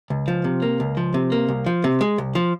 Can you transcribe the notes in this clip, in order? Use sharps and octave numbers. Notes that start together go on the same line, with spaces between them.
C#2
F3
C3
A#3
C#2
F3
C3
A#3
C2
F3
C3
G#3
C2
F3